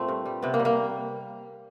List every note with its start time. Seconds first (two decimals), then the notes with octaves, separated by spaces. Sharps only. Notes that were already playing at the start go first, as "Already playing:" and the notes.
Already playing: A#2 A3 C4
0.08 G2
0.26 G3
0.42 C3 B3
0.54 A#3
0.59 G3
0.65 A#3